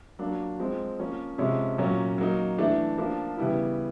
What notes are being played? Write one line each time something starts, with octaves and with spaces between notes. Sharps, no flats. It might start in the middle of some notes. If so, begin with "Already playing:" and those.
F#3 A#3 D4 F4
F3 G#3 C4
F3 A#3 C#4
C3 F3 G#3 C#4
A#2 F#3 A#3 C#4
F#3 A#3 D#4
E3 A3 D4
F3 A#3 D4 F4
C#3 E3 G3 B3 E4